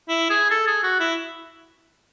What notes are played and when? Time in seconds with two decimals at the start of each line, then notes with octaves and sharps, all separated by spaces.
0.08 E4
0.29 G#4
0.51 A4
0.67 G#4
0.83 F#4
1.00 E4